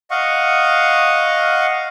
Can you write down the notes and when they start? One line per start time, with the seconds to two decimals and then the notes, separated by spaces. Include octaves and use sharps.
0.11 D#5 F5 F#5 C#6